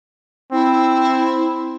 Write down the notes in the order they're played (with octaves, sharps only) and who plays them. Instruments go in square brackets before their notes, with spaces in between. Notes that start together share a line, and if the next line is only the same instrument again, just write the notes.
[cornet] C4 [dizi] E4